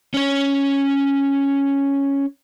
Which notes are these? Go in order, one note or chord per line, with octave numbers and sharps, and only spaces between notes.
C#4 C#5